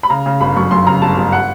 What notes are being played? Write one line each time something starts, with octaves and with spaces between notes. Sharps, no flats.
B5
C#3 A#5
C#3
G1 B5
F#2 C#6
F#2 C6
C#3 A#5
G1 A5
G1
F#5